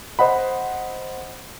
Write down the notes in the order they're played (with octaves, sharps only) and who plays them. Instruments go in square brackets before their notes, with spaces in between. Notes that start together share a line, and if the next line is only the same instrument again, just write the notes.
[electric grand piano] C5 D#5 F#5 B5